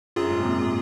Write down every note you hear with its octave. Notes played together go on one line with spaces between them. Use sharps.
F#2 F4 G#4
G#2
C3
A#2